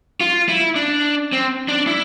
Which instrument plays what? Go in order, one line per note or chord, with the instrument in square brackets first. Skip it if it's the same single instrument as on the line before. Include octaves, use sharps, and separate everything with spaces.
[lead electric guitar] F4
E4
D4
C4
D4
E4